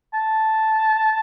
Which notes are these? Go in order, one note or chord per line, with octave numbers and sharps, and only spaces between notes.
A5